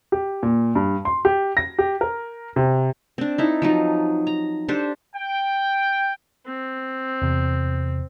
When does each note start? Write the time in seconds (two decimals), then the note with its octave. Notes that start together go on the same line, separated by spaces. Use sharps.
0.12 G4
0.43 A#2
0.75 G2
1.05 C6
1.25 G4
1.57 A#6
1.79 G4
2.01 A#4
2.56 C3
3.18 C4 D4
3.38 D#4 E4 A4
3.62 F3 F#3 D#4
4.27 A#5
4.68 D4 G4 A4 C5
5.15 G5
6.46 C4
7.22 E2 C3